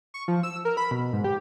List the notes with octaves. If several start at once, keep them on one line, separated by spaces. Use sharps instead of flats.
C#6
F3
E6
A#4
B5
B2
G#2
G4